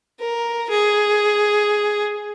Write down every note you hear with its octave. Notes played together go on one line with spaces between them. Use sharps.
A#4
G#4